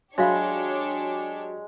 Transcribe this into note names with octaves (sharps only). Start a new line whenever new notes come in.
F#3 G#3 D4 G4 C#5 E5 F5 B5